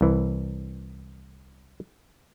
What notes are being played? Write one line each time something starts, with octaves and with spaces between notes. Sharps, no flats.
C2 E3